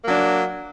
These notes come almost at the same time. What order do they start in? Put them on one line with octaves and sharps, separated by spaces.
A#3 F#3 D4